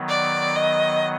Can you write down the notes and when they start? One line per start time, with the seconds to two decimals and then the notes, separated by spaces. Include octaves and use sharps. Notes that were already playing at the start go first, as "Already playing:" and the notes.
Already playing: D#3 F#3 B3
0.09 D5
0.56 D#5